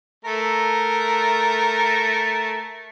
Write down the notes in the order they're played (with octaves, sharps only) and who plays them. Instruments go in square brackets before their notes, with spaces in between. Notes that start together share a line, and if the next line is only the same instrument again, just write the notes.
[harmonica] A3 A#4